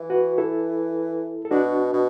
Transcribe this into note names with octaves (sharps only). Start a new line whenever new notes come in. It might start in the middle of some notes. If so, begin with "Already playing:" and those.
Already playing: E3
F#4 B4
E4 A4
A4
B2 D4 F#4
B2